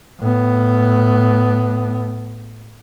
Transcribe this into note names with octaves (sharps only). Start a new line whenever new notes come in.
A2 B3